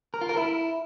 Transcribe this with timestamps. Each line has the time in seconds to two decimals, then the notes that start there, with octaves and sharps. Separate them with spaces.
0.14 A#4
0.21 F4
0.29 A#4
0.37 E4